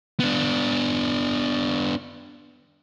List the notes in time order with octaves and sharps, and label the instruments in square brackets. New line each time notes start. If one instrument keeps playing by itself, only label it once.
[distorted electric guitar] B3 D4